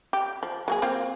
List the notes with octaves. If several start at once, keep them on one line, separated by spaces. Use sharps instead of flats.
G4
F3
F#3 A#3 G#4
A#3 C4 F4